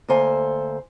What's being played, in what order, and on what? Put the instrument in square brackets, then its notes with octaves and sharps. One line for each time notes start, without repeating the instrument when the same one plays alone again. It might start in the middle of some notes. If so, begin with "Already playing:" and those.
[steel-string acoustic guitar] D2 A#3 A4 C5 G#5